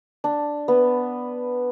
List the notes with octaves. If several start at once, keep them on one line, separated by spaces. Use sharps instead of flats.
D4
B3